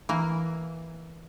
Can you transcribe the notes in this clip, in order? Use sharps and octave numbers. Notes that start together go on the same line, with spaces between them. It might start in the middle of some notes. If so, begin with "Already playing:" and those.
E3 A#3